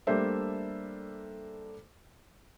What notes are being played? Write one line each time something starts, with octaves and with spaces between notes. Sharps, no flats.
G3 A3 A#3 D4 C5 E5